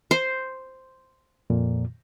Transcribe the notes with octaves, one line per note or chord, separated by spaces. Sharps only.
C5
F2 A#2